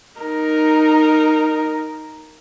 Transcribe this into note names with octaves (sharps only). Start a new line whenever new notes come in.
D#4 A#4